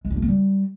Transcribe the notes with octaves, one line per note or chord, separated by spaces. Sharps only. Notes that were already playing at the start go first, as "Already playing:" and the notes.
G#3
D4
A3
A#3
G3